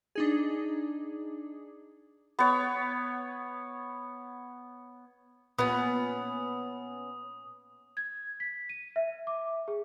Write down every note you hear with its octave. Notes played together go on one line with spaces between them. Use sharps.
D4 D#4 G#4
B3 C#5
A#2 B3 C#4 B4 D#6
G#6
B6
D#7
E5
D6
G#4